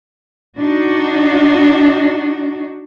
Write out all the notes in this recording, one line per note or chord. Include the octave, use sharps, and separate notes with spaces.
D4 D#4 F#4